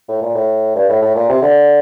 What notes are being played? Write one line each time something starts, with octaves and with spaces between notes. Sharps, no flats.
A2
A#2
A2
G2
A2
A2
A#2
C3
D3